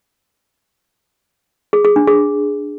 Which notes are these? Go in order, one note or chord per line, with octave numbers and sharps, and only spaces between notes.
G#4
G#4
D4
G#4